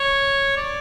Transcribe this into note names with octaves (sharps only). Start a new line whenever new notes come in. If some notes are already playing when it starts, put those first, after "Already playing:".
Already playing: C#5
D5